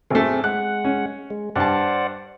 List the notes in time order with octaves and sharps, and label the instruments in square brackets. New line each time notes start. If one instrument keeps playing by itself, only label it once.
[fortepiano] G#1 A3 [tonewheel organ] C4 G#4
[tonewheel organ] G#3 F#5 [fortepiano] F#6
[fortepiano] C#4
[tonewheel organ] G#3
[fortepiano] G2 A5 [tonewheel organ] C5 D5 F#5